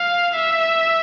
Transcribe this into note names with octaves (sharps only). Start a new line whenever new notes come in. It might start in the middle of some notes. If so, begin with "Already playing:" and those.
Already playing: F5
E5